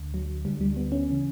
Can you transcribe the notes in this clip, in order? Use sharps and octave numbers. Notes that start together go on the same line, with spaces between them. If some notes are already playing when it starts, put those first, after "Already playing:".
Already playing: D2 D3
F#3
D2 D3 G3
G3
B3
C#4
C#3 E3